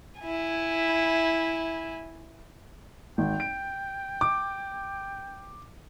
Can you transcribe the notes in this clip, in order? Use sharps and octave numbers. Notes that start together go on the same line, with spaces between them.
E4 G#5
G#1 G5
D7
D6